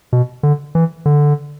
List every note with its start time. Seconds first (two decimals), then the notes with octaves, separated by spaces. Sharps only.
0.13 B2
0.43 D3
0.75 E3
1.06 D3